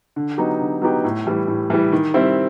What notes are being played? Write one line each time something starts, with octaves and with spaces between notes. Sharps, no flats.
D3
F#3 B3 D#4 G4
D3
F#3 B3 D#4 G4
A2
E3 G3
A2
E3 G3
D#3
G3 C4 E4